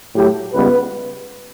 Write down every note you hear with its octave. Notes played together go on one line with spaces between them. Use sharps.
A2 F#3 A3 G4
C#2 C#3 G3 B3 B4